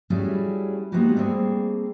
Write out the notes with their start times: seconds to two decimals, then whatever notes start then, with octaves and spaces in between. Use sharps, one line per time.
0.10 G3 A3 C#4 E4 F#4 G#4
0.92 G#3 A#3 B3 D#4 F#4 G4
1.16 G3 A3 A#3 C4 G#4